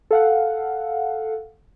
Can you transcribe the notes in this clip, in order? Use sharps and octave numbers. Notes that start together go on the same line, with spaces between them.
A4 F5 F#5